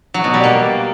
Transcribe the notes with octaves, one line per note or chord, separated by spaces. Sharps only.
F#3
B2
G3
A#3